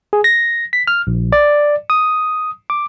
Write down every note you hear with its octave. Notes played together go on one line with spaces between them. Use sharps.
G#4
A#6
B6
F6
A#1
D5
D#6
D6